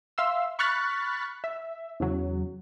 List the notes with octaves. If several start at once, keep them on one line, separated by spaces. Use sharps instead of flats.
E5 F5 C6 E6
B5 C#6 F6 F#6 A6 B6
E5
E2 C#3 F#3